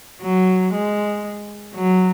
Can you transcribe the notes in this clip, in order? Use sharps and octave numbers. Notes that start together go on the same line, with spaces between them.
F#3
G#3
F#3